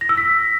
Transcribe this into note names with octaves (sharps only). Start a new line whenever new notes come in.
A#6
E6
B6